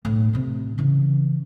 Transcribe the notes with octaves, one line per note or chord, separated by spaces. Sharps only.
B1 A2
A1 C3
C#3 E3